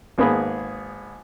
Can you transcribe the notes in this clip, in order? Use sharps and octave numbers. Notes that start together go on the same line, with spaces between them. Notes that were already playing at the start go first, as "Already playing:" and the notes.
G#1 A#3 B3 G#4 B5